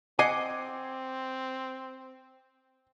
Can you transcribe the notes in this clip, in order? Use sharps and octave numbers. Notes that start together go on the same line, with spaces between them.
C4 D#5 F#5 G#5 D6 G#6 C7